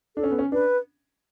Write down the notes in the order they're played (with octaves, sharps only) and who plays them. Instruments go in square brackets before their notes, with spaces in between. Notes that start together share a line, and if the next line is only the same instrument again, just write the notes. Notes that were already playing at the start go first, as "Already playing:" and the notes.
[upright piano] D4 [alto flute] A4
[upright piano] C#4
B3
C#4
[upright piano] D4 [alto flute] B4